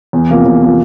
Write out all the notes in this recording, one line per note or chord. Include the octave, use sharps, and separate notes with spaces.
E2
C3 F3 A#3
E2
C3 F3 A#3